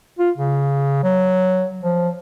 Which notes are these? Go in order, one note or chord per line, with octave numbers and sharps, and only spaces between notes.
F4
C#3
F#3
F3